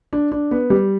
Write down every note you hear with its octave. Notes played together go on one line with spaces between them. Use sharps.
D4
D4
B3
G3